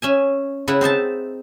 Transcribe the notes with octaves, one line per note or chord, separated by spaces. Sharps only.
C#4 E5 G#5
C#3 E4 B4 F#5 B5
C4 D#4 E5 A5